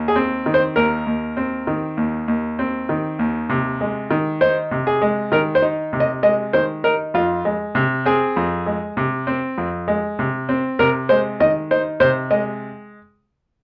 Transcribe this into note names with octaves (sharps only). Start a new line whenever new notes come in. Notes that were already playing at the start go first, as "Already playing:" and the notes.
Already playing: D#2
G#4
C4
D#3
C5
D#2 A#4
D#2
C4
D#3
D#2
D#2
C4
D#3
D#2
C3
G#3
D#3
D#4 C5
C3
G#4
G#3
D#3 A#4
C5
D#4
C3
D#5
G#3 D#5
D#3 C5
D#4 A#4
F2 F4
G#3
C3
C4 G#4
F2
G#3
C3
C4
F2
G#3
C3
C4
C3 A#4
G#3 C5
D#3 D#5
D#4 C5
C3 C5
G#3 D#5